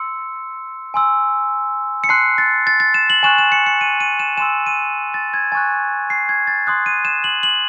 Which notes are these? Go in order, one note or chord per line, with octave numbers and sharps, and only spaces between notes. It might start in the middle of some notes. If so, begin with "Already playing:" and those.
Already playing: C6 E6 C#7
G#5 C6 E6
C#7
A5 C6 F#6 C7
A6
A6
A6
E7
F#7
G#5 C#6 F#6 E7
E7
C#7
C#7
D#7
D#7
E7
G#5 C6 E6 E7
D#7
A6
G#6
G#5 C#6 F#6 A6
C7
G#6
A6
C6 D#6 F#6
D#7
E7
F#7
F#7